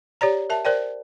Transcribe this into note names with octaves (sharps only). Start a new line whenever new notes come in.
G4 C#5 D5 A#5
A#4 E5 A5
A#4 C5 D5 G5